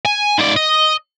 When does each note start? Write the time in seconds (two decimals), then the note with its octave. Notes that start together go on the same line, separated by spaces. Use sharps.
0.05 G#5
0.38 G#2 D5
0.56 D#5